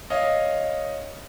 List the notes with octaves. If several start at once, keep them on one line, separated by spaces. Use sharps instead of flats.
C#5 D#5 F5